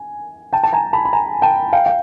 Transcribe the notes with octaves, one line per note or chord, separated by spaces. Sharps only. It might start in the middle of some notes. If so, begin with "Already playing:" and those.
Already playing: G#5
G5 A5
A5
G#5 A#5
A5 B5
B5
G#5 A#5
G5 A5
F5 G5
F5